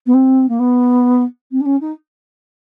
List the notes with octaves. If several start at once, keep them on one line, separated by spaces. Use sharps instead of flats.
B3
C4
A#3
B3
C4
D4
C#4
D#4